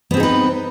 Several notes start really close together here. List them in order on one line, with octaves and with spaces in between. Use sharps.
B3 C4 G#4 D#4 B4